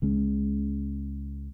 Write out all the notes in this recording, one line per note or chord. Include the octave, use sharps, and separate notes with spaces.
C#2 C#3 G#3 C#4